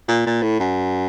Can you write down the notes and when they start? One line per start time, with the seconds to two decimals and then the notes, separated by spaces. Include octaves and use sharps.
0.08 A#2
0.26 A#2
0.42 A2
0.60 F#2